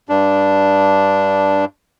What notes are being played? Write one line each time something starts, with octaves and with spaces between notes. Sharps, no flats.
G2 D4